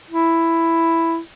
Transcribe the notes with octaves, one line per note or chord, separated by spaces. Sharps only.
E4